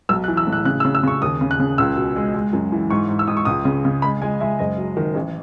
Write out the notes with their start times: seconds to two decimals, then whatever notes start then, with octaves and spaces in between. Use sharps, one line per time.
0.09 B1 E6
0.24 F#6
0.28 E3
0.37 E6
0.47 A2
0.52 F#6
0.65 C#3 F#6
0.80 E6
0.85 C#3
0.95 E6
1.03 C#3 C#6
1.22 D#2 D#6
1.41 C#3
1.51 F#6
1.60 C#3
1.78 C#2 E6
1.97 B2
2.16 G#3
2.34 G#3
2.53 F#2
2.72 E3
2.90 G#2 C#6
3.09 G#2
3.19 E6
3.27 G#2 D#6
3.37 C#6
3.45 C#2 D#6
3.65 C#3
3.85 C#3
4.02 G#3 B5
4.21 G#3 G#5
4.40 G#3 E5
4.59 F#1 D#5
4.78 F#3
4.97 D#3
5.15 A1